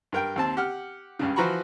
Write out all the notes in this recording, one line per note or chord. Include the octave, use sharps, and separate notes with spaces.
G2 A#4 G5
D#2 C4 A5
G4 F#5 F6
C#2 G2 C#3
E3 F3 F#4 A#5 B5 C#6